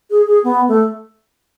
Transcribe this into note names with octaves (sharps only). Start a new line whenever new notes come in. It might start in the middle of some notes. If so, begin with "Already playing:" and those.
G#4
G#4
B3
A3